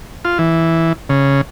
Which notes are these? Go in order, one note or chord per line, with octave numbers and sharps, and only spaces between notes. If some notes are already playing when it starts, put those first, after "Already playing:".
F4
E3
C#3